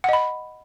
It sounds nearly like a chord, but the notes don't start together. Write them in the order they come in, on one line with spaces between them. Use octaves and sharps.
F#5 D#5 B5